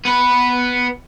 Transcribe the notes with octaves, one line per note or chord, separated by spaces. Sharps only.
B3 B4